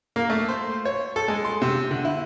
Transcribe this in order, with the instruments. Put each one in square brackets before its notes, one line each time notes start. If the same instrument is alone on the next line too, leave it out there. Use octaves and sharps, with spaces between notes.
[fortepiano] A#3
A3
C5
C#5
A4
G#3
C6
C3
D3
E4